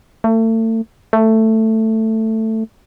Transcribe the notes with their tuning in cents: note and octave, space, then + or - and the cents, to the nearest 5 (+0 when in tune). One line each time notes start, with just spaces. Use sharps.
A3 +35
A3 +10